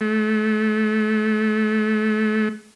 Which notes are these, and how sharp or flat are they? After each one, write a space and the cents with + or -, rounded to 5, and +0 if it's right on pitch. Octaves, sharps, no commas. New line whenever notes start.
A3 -30